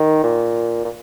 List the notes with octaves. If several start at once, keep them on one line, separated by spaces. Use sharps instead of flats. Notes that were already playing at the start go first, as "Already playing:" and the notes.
Already playing: D#3
A#2
A#2